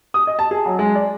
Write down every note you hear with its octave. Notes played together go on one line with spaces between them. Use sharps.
D#6
D#5
A5
G#4
F#3
G#3
D5